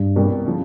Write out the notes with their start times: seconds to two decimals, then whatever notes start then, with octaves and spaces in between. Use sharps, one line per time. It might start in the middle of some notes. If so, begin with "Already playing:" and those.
Already playing: G2
0.16 C2 B2 G3 A#3
0.47 C#3 F3